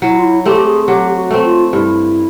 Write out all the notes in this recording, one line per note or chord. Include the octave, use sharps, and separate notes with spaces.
F#3 E4
F4
E4
A3 C4 G4
G4
G#4
F#3 G4
F#4
A3 C4
F4
G2 E4